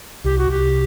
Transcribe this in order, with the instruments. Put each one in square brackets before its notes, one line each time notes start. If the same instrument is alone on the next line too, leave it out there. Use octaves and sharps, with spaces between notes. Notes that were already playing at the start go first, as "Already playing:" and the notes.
[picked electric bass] C2 [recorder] G4
[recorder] F#4
[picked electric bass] C2 [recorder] G4